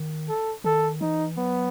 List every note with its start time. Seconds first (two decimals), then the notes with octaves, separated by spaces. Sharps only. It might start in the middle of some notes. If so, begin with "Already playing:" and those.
Already playing: D#3
0.29 A4
0.64 D#3 A4
1.01 E3 D#4
1.37 F#3 B3